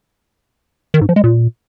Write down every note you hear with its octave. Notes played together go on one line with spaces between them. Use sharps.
D#3
G#2
F3
G#3
A#2